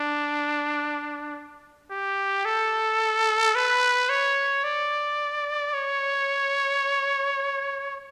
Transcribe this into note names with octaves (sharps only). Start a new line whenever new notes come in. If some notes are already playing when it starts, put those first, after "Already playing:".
Already playing: D4
G4
A4
B4
C#5
D5
C#5